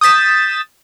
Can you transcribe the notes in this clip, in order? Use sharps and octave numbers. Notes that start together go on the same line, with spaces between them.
D#6 G6 A6 B6 E7